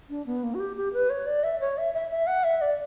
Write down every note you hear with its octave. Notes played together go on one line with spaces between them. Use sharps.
D4
B3
A#3
F#4
G4
G4
B4
C#5
D5
E5
C#5
E5
E5
E5
F#5
E5
D5